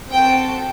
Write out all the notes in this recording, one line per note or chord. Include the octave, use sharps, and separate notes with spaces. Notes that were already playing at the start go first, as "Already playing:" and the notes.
C4 F#4 A4 G5